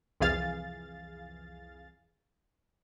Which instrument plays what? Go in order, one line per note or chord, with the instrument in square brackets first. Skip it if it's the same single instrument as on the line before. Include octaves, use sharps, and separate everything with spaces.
[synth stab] C2 F2 E3 G#4 F5 A6